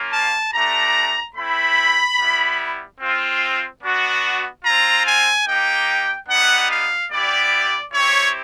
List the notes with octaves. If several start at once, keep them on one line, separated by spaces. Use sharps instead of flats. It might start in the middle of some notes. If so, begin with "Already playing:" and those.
Already playing: A#3 C#4 F4
A5
A3 D4 G4 A#5
A3 C4 E4 B5
G3 B3 E4
C4 F4
B3 D4 F#4
C4 F4 A#5
G#5
A#3 D#4 G4 G5
G3 B3 D#4 F#5
F5
G3 B3 E4 G4 D5
C4 E4 G4 C#5